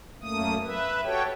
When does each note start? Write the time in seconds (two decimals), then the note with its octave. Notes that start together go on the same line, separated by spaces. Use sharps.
0.22 F#2 A3 A#3 D#6
0.65 B4 E5
1.04 F#4 G4 A4 C#5 G5